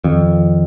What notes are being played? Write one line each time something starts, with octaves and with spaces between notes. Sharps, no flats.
F2 D#3